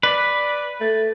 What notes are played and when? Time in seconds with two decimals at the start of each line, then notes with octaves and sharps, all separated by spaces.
0.03 B4 D5
0.80 A3